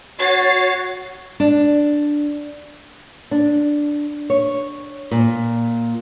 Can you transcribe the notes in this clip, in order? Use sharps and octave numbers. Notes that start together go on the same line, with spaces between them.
F#4 C#5 A6 C7
D4
D4
C#5
A#2